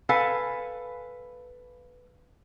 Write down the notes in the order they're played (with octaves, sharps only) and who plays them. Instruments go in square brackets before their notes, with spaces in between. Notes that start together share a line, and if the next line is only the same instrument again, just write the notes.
[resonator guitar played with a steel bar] A4 B4 F5 G#5